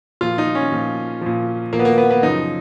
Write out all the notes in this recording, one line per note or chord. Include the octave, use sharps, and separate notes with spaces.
A#2 F3 F4
D#4
C#4
A#2 F3
A#2 F3
A#2 F3 A#3
B3
A#3
B3
B3
F#2 C#3 F3 D#4